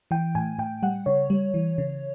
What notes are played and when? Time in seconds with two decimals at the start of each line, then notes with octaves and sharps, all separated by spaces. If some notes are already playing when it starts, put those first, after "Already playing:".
0.11 E3 G5
0.35 A2 G#5
0.59 A2 G5
0.83 G3 F#5
1.06 C#3 C#5
1.30 G3
1.54 E3
1.78 C#3